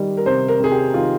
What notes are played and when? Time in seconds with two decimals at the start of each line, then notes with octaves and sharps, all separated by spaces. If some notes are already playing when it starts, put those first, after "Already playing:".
Already playing: D#3 G3
0.17 A#4
0.26 C3 C5
0.48 A#4
0.60 C3 G#4
0.72 G4
0.94 D#3 F4